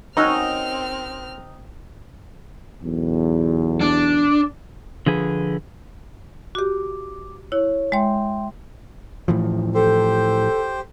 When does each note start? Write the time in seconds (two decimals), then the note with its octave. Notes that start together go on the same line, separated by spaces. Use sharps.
0.17 C4 C#4 D#4 F#4 A#4 D#5 E6 F6
2.82 B1 E2
3.81 D4
5.06 D3 F3 G#4 B4
6.55 F#4 G4 D6
7.52 E4 C#5
7.92 G#3 C#5 E5 G5 C6
9.28 A2 E3 F3
9.74 G4 A4 C5